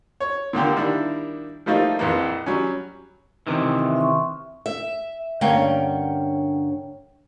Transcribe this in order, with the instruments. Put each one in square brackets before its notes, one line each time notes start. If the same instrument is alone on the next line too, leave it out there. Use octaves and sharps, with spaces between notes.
[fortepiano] C#5
A#2 D3 A#3 G4
D#3 G3 A#3 D4 E4
F3 G3 A3 A#3 D#4 F4
A#1 F2 E3 A#3
F#3 G3 C#4
[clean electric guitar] C3 D#3 E3
[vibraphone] E5
E5 C6 C#6
[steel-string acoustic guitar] E5
G2 D3 A#3 C#4 C#5 G5